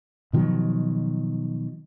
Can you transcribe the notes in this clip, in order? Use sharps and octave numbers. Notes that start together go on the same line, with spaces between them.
B2 D#3 F3 F#3